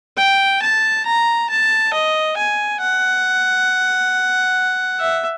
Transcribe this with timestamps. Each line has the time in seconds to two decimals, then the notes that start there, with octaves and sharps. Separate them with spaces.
0.17 G5
0.62 A5
1.06 A#5
1.50 A5
1.93 D#5
2.37 G#5
2.81 F#5
5.00 E5